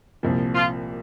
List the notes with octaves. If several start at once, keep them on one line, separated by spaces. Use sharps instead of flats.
C2 A#2 F3
F4